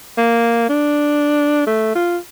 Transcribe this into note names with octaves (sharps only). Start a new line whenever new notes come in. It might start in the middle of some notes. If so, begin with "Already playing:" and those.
A#3
D4
A3
F4